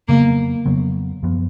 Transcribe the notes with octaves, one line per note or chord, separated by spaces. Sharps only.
F2 C#3 F#3 A#3 B3
F2 C#3 F#3 B3
F#2 F3 B3